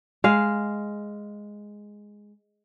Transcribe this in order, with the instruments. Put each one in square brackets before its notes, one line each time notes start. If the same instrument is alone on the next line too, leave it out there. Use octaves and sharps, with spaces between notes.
[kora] G#3 F5